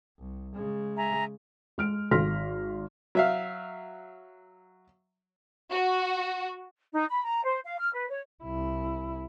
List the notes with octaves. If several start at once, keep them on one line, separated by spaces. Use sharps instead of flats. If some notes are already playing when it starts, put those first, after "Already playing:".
C2
C#3 G#3
E5 G#5 A#5
G#3 F6 D7
G#1 C6 F6 A#6 B6
F#3 E5 F5
F#4
D#4
B5
A#5
C5
F5
F6
B4
C#5
C2 E4